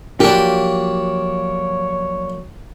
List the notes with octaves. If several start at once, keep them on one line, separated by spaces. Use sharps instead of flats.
F3 F#3 A#3 D4 F4 G4 C#5